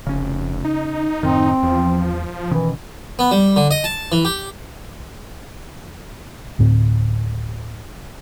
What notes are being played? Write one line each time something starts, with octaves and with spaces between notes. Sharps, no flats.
F1 C#3 C#4
D#4
F#2 A2 D#3 C4
E2 F3
B2 D#3 E3 C#4
B3
G3
D3
D#5
A5
E3
G4
D2 A2 C4